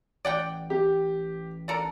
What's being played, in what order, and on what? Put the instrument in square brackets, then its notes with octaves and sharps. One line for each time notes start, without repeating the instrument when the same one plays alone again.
[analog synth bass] A1 [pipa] D5 F#5 G5
[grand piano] G4
[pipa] D4 A4 A#4